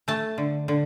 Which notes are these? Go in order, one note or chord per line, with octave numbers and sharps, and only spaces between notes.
A3 A5
D3
D3